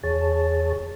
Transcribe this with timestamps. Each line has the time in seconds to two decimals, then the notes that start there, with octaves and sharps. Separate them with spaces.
0.03 E2 G#4 C#5 A5